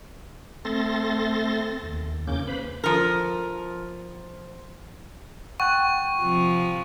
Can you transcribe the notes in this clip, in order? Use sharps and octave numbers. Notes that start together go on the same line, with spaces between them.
A3 C4 A4 C6 A6 A#6
D#2
E2 C#3 A#3 C#4 D6 G6
B4 C5 B5
F3 A#4
F#5 G5 C#6 F#6
C3 F3